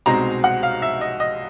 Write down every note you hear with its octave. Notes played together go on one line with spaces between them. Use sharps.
C2 B2 G#3 C4 D#4 A#5
F#5
F5
E5
D#5
D#5